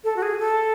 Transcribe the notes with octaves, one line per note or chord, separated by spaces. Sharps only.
A4
F#4
G#4
A4